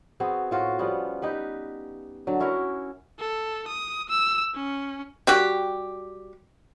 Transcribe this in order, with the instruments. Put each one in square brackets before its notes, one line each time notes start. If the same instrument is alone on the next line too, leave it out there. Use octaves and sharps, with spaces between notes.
[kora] B3 C4 F#4 G#4
A2 F4 F#4
F3 G3 B3 C#4
D#4 G4 B4
D3 F#3
C#4 E4 F#4 A#4
[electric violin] A4
D#6
E6
C#4
[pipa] G3 F#4 G4